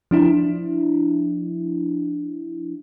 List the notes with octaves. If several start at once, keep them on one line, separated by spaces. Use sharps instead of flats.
F3 D4 E4